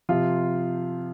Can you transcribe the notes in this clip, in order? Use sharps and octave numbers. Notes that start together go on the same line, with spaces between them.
C3 F3 F4